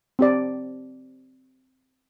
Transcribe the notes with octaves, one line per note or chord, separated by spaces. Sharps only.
C4 G4 D5